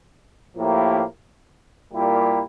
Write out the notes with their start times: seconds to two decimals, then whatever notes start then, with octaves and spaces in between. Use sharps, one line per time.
0.56 A2 F3 A#3 E4 G4
1.93 A#2 G3 A#3 E4 G4